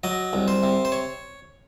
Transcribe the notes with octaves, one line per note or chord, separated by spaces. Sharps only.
F#3 D#5
C2
C5
C3
C5
C#5